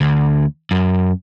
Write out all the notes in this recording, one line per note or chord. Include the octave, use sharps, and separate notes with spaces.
D2
F#2